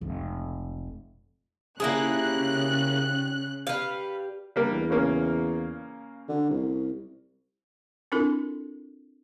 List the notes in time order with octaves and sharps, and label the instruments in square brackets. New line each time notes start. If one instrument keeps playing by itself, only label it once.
[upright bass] F1 C#2
[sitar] G#2 G3 [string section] C#3 F#6 [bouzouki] A#3 E4 G#4
[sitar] G3 [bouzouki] B4 F5
[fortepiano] G3 A#3 D4
[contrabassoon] E2
[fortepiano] C#3 A#3 C#4
[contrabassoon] D3
C2
[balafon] C4 D4 E4 F4 A4 A#4